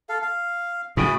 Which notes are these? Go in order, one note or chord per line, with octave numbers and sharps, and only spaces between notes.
A4 F5
F5
A2 C#3 F#4 G#4 B5